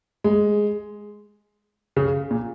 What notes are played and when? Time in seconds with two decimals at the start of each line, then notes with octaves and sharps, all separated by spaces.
0.24 G#3
1.96 C#3
2.31 A#2